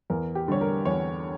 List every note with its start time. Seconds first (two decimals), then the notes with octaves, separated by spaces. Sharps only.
0.10 E2 A#4
0.35 G4
0.48 D3 G3 C#5
0.61 A#4
0.85 E2 C#5